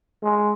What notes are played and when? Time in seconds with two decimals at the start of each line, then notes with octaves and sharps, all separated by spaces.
0.23 G#3